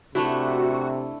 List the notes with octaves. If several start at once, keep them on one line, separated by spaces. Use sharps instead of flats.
C3 A3 D4 E4 F#4